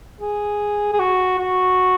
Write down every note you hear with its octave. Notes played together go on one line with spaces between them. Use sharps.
G#4
G#4
F#4
F#4